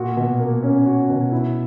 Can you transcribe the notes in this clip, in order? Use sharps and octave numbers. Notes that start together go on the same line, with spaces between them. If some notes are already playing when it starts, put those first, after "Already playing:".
Already playing: A#2 F#4
B2
A#3
C#4
F#4
B2
E4